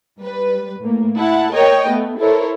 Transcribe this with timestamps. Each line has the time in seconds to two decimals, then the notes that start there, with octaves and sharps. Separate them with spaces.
0.20 G3 B4
0.81 A2 A#3
1.17 E4 F#5 A5
1.54 A#4 C#5 D#5 G5
1.89 A3 B3
2.20 E4 A4 A#4 C5 C#5